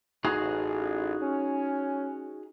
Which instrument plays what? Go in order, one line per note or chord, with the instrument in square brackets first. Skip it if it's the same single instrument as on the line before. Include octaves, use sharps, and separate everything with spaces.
[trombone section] A1 [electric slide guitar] D#4 F#4 G#4
[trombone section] C#4